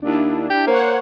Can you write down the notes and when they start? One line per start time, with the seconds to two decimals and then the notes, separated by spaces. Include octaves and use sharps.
0.02 D#2 D4 E4
0.50 G4
0.67 A#3 C5 C#5 F#5